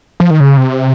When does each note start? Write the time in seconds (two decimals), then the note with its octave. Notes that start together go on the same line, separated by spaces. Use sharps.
0.20 F3
0.31 D#3
0.40 C#3
0.57 C3